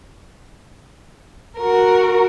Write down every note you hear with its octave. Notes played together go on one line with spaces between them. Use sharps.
F#4 A#4